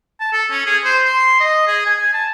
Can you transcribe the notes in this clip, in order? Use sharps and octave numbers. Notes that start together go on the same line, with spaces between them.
A5
A4
C#4
G#4
C5
C6
D#5
G#4
G#5
A5